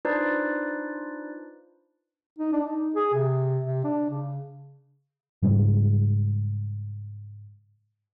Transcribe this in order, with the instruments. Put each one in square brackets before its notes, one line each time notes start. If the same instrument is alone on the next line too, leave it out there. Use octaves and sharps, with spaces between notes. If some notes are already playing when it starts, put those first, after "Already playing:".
[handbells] D4 D#4 F4 B4 C5 D5
[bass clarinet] D#4
D4
D#4
G#4
C3
C3
D4
C#3
[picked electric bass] G#2 C#3 G3 G#3